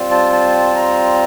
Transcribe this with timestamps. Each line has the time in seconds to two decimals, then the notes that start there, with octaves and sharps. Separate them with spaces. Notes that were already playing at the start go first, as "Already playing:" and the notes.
Already playing: G3 C4 F4
0.11 A5
0.32 A5
0.76 A#5